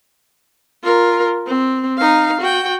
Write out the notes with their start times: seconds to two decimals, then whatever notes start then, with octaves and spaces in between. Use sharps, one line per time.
0.84 F4 A#4
1.47 C4
1.98 D#4 F5
2.41 F#4 G5